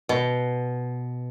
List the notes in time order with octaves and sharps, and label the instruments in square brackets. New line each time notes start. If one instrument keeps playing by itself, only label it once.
[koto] B2